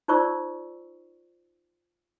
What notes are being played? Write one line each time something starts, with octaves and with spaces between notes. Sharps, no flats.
D#4 F4 C5 D5 C#6 E6